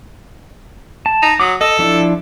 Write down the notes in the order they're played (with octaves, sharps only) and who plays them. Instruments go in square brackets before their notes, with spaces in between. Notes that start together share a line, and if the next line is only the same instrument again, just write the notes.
[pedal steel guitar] A5
[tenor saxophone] D#4
[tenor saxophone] F#3 [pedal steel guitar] D6 D#6
[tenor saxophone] A4 [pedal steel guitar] D#5
[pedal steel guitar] F3 D4 E4